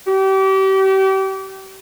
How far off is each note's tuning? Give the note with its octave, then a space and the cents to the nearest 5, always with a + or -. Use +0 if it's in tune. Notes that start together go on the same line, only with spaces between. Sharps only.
G4 -35